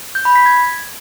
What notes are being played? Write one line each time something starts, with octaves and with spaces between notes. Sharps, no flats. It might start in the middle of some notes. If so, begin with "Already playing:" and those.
G6
B5
B6
G#6